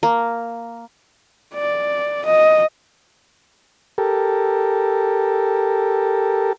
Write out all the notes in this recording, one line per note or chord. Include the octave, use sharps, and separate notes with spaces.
A#3
D5
D#5
G4 A4 A#4